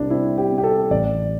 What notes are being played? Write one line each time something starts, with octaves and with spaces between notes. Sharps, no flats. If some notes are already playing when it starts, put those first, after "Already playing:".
Already playing: C2 C3 D4 E4
C4 E4
G4
C4
G4
A4
A1 D5